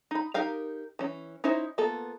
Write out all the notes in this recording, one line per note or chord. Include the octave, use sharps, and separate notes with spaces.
D#4 B5
D#4 G4 A#4 F5 G5
E3 C#4
C#4 D#4 E4 C5
A#3 B3 F4 A4